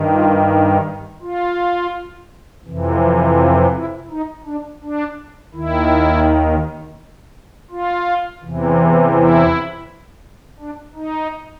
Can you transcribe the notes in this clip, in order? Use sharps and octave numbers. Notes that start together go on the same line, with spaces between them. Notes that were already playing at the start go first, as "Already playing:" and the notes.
Already playing: G2 D#3
F4
F4
F2 C3 E3
F4
E4
D#4
D4
D4
D#2 D#3 E4
F4
E2 C3 E3
E4
D4
D#4